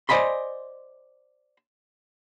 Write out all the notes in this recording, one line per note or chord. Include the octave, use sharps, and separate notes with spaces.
C5 D5 D#5 G#5 B5 C6